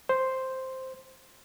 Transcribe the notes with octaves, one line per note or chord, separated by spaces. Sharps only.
C5